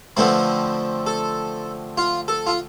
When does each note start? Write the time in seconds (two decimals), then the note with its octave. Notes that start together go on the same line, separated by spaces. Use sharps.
0.17 D3 F3 A3 C4 B4
1.06 A4
1.97 F4
2.28 A4
2.47 F4